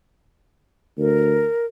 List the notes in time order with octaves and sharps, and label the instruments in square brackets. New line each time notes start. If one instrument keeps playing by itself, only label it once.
[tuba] D2 [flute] A#4